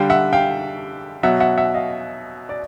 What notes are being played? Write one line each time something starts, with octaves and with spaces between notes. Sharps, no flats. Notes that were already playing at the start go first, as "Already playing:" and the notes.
Already playing: D3 G3 F5 G5
E5 F#5
F5 G5
B2 F#3 E5 F#5
E5 F#5
E5 F#5
D#5 F5
D5